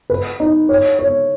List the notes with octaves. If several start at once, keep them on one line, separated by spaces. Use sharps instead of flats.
B4
D#4
C#5
C#5